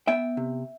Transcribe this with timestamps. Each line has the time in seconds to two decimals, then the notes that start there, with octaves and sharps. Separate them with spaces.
0.07 B3 E5 G5
0.37 C3